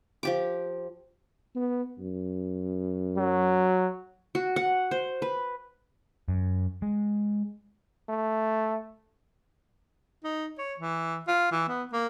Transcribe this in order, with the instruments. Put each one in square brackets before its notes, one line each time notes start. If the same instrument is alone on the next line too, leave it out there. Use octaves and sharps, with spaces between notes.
[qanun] F3 G4 D6
[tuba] B3
F#2
[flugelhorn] F#3
[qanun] F#4
F#5
C5
B4
[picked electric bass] F#2
G#3
[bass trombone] A3
[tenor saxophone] D#4
C#5
E3
F4
E3
B3
A#3